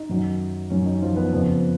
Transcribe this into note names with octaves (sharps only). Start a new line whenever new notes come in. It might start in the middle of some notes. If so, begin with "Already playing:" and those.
Already playing: D#4
F#2 D#3 F#3
F#2 D#3 F#3 C#4
D#3 D#4
F3 F4
B3 B4
F2 C#3 F3